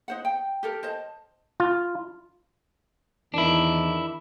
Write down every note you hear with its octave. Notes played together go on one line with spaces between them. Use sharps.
D#4 C5 F#5
G5
G4 A4 A#4
C5 D#5 A5
F4
E2 D#3 D4 E4